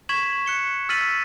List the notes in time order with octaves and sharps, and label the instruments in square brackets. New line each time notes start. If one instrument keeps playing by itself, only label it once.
[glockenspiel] C#6 G#6 B6 E7 F#7
F#6 C#7 G7
E6 F6 A6 B6 D#7 F#7